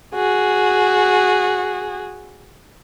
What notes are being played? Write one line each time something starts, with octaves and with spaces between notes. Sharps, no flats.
F#4 G#4